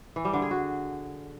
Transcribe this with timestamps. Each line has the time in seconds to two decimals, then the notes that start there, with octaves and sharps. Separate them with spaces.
0.16 E3
0.25 G3
0.33 D3
0.42 G#4
0.51 F#4